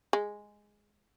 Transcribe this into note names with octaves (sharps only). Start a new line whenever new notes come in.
G#3